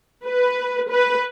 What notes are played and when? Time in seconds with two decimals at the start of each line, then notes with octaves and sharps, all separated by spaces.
0.25 B4
0.91 B4